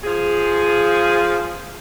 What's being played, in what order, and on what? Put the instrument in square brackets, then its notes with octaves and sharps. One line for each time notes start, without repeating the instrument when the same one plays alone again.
[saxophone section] F3 G#4